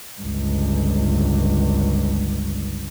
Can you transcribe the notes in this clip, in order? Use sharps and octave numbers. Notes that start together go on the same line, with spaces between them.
G1 C#2